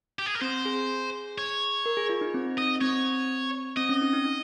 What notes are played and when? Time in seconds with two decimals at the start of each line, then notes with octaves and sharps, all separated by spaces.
0.19 G4
0.26 G#4
0.35 A#4
0.41 C4 C5
0.65 G#4
1.38 C#5
1.86 A#4
1.97 G#4
2.09 F4
2.21 D#4
2.34 C4
2.58 D#5
2.81 C4 C#5
3.77 C4 D#5
3.89 C#4
4.02 D#4
4.13 D#4
4.25 D#4